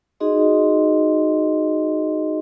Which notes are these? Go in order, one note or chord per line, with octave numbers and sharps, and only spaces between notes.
D#4 F#4 G#4 D#5 C6